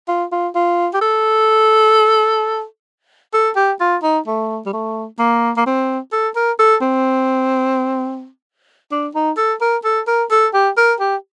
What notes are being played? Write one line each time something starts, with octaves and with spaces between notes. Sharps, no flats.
F4
F4
F4
G4
A4
A4
G4
F4
D#4
A3
G3
A3
A#3
A#3
C4
A4
A#4
A4
C4
D4
D#4
A4
A#4
A4
A#4
A4
G4
A#4
G4